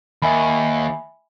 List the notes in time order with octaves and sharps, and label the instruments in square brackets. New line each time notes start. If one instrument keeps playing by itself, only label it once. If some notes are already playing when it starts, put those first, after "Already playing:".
[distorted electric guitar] D#2 [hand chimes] E5 G#5 B5